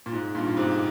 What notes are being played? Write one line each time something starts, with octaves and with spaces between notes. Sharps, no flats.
A#2
G#2
G2 A#2
A#2
G#2 C3